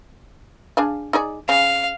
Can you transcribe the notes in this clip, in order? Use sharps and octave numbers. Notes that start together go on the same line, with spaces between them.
D4 G#4 F5
D#4 G#4 D5
C#3 F5